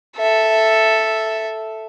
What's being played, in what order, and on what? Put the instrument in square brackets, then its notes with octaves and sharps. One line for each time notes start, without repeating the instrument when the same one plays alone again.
[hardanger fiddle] A4 E5